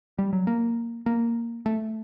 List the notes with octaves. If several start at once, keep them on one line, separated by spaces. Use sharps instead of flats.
G3
F#3
A#3
A#3
A3